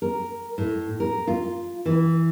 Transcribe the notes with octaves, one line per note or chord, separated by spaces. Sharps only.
A#4
A2
A#4
F4
E3